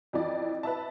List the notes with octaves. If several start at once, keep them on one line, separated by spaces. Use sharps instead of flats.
F2 E3 D5
B4 E5 A5